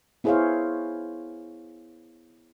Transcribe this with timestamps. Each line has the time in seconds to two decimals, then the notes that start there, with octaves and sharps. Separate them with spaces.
0.24 B3 E4 G#4 C5 C#5 F5